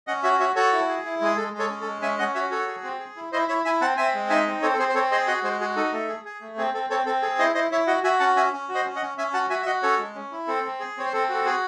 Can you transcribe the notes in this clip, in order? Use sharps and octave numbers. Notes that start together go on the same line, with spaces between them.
C#4 D#5 F#5
F#4 C#5 E5
F#4 C#5 E5
F#4 A4 C#5
E4
G#4
E4
G#3 G#4
G#3 A4
G#3
A4 C#5
C#4
A4
G#3
C#4 E5 G#5
C#4 D#5 F#5
F#4 C#5 E5
F#4 A4 C#5
G#4
C4
G#4
E4
E4 C5 D#5
E4 C#5 E5
E4 E5 G#5
C4 F#5 A5
C4 E5 G#5
G#3
D#4 E5 G#5
C4
C4 A4 C#5
A4
C4 G#4 C5
C5
C4 A4 C#5
G#4 C5 D#5
F#4 D#5 F#5
G#3 G#4 C5
F#4 G#4
D#4 A4
A3 A4
G#4
G#4
A3
C4 G#4
C4 A4
C4 A4 C#5
C4 A4
G#4 A4
E4 C5 D#5
E4 C5 D#5
E4 C#5 E5
F#4 D#5 F#5
F#4 E5 G#5
C#4 F#5 A5
C#4 E5 G#5
C#4
F#4
C5 D#5
C#4
D#5 F#5
C#4
C#4 E5 G#5
F#4 F#5 A5
F#4 E5 G#5
E5
F#4 D#5 F#5
C#4 A4 C#5
G#3
C#4
E4
C4 A4
C4
G#4
C4 C#5
C5
C4 A4
F#4 A4
F#4 G#4